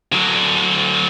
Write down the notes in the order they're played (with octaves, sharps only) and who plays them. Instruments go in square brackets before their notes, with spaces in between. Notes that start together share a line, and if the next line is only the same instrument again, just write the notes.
[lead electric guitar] D3 F#3